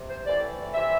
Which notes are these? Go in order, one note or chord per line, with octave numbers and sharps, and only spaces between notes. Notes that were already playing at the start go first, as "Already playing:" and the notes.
Already playing: C3
C5
A2 E3 D5
C3 E3 E5